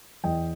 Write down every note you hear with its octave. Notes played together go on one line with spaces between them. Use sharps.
E2 D#5 G5